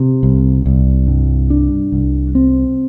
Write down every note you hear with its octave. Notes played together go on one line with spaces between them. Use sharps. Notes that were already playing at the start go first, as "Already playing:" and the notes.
Already playing: C3
C2
C2
G2
D4
C2
C4